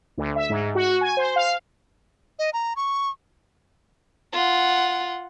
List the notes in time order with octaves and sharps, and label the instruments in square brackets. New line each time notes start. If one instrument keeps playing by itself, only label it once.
[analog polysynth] D2
E5
G#2
F#4
G#5
C5
F5
[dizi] D#5
A#5
C#6
[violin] F4 F#5